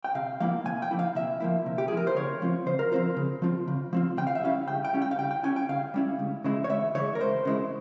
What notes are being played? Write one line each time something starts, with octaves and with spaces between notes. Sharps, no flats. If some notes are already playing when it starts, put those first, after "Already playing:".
G5
C3 F5
F3 A#3 E4 F5
C3 G#5
G5
F3 A#3 E4
F5
C3 E5
F3 A#3 E4
C3
G4
F3 A#3 E4 G#4
A#4
C5
C#3 C#5
F3 C4 F4
C#3 C5
A#4
F3 C4 F4 C5
C#3
F3 C4 F4
C#3
F3 C4 F4
C#3 G5
F5
E5
G3 C#4 E4 F5
C#3 G5
G5
G3 C#4 E4
G5
F5
C#3 G5
G5
G3 C#4 E4 G#5
G5
C#3 F5
G3 C#4 E4
C#2
C#3 E3 G#3 E4
C#5
C#2 E5
C#3 E3 G#3 E4 C#5
A#4
C#2 C5
C#3 E3 G#3 E4